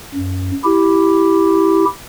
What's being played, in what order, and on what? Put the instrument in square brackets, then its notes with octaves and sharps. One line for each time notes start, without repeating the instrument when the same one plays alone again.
[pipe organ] F#2
E4 G4